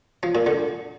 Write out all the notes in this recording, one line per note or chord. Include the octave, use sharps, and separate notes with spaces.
F3
A#2
D3